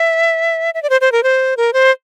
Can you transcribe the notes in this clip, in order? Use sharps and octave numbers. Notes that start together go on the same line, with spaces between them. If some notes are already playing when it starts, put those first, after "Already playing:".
Already playing: E5
E5
D5
C5
C5
A#4
C5
A#4
C5